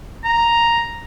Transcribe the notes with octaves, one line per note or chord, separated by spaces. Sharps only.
A#5